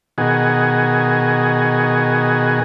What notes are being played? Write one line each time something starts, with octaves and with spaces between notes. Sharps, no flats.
B2 D#3 F#4 G#4